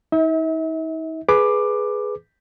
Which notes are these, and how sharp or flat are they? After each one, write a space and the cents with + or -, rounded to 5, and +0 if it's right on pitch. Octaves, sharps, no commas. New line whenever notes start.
D#4 +40 E5 -40
G#4 +10 B4 +0 D6 +10